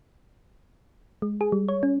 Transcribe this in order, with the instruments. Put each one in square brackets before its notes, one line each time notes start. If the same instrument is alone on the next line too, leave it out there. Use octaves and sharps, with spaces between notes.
[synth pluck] G#3
G#4
G3
C#5
C#4